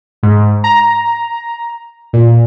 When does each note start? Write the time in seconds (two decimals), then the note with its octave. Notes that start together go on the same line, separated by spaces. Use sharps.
0.23 G#2
0.64 A#5
2.13 A#2